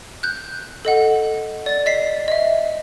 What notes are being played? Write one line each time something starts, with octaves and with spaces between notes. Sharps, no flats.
F#6 G6
A4 D#5 F#5
D5 A6
D#5 B6 C7
D#5 E5